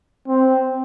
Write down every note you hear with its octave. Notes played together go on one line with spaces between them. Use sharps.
C4